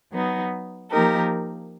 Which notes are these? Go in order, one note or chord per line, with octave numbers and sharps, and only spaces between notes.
F#3 B3 D#4
F3 A#3 D#4 G4 A#4